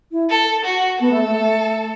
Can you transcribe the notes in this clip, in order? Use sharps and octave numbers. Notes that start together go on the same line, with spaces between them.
E4
A4
F#4
B3 A4
A3
A3
A3